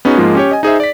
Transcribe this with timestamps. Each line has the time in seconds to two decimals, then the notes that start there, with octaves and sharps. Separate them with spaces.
0.05 B3 C#4 D#4 F#4 G#4
0.17 G#2 F3 G#3 A#3 F4
0.35 C#4 G4 C#5
0.51 D#5 G#5
0.63 D#4 G#4 C5 E5
0.80 D5 B6